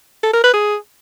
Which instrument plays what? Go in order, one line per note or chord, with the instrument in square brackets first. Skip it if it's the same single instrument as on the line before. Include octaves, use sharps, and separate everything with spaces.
[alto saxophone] A4
A#4
B4
G#4